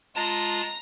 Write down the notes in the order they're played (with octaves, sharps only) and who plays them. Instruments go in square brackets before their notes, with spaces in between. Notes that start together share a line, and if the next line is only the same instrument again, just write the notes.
[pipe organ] G#3 F4 A5 [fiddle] A#5